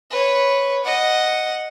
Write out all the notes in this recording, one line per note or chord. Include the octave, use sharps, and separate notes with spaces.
B4 C#5
D#5 F#5